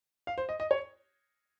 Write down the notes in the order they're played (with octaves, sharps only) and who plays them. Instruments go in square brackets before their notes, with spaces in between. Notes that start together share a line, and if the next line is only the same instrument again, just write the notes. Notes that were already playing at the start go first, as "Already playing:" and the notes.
[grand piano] F5
C5
D#5
D#5
C#5